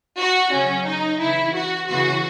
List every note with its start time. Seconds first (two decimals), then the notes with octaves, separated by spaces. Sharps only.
0.19 F#4
0.53 C#3 F#3 C#4
0.87 D#4
1.20 C#3 E3 E4
1.55 F#4
1.88 C#3 E3 F#4